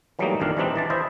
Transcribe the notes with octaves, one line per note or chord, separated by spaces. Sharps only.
E3 F#3 G3 A3 A#3 D#4
A1 F2 D#3 D4 F5
E3 G3 C4 D4 D#4
E3 D5 A5
E4 C5 D#5 E5